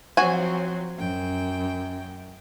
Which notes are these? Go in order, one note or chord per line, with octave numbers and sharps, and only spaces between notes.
F3 F#3 C4 F#4 G#5
F#2 G5